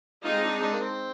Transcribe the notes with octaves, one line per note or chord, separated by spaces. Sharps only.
G#3 C4 D#4 F4
D4
D4
A#3
C4